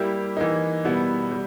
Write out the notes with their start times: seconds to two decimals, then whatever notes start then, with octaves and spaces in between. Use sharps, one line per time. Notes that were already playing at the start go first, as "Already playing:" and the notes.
Already playing: G3 A#3 E4 G4
0.37 E3 A#3 D#4
0.84 B2 G3 B3 E4
1.32 G3